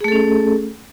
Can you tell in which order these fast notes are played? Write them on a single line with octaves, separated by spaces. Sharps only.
G#4 A3 A4 C#4